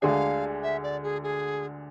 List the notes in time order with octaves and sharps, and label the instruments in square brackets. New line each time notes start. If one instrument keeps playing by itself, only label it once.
[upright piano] D2 D3 G#3 D4 G#4 [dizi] F5 G#5
[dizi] E5
D5
G#4
G#4